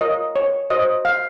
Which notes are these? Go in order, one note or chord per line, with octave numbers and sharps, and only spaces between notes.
F4 A#4 C#5 D#5
C#5
F#4 C5 D#5
F5